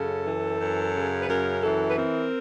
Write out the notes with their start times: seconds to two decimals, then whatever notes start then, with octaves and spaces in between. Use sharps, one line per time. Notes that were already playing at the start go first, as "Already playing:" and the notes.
Already playing: F#2 C#3 A4
0.27 E3
0.60 F#2
0.95 C#3
1.21 B4
1.29 F#2 A#4
1.63 E3 A4
1.88 B4
1.96 C4 A#4